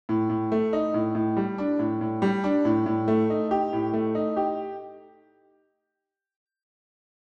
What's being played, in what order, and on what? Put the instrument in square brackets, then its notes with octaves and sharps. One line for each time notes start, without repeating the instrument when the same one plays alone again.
[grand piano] A2
A2
A3
D#4
A2
A2
G3
D4
A2
A2
G3
D4
A2
A2
A3
D#4
G4
A2
A3
D#4
G4